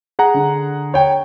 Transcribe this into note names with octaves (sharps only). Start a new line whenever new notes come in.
G#4 F#5 A#5
D3
C#5 G5